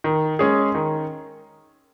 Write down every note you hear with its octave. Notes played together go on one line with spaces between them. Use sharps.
D#3
G#3 C#4 G#4
D#3